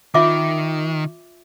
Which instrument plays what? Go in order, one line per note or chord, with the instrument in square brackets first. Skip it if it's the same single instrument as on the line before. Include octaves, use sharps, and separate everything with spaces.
[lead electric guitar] D#3 [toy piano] F4 E5 D6